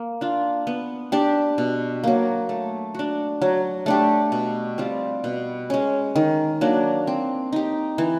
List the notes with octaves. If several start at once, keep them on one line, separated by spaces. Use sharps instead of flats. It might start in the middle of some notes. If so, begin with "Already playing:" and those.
Already playing: A#3
D4 F4
B3
D4 G4
B2
F#3 A#3
A3
D4 F#4
F#3
A3 D4 G4
B2
G3 C4 F4
B2
G#3 C#4
D#3
F#3 A#3 D4
C4
D#4 G4
E3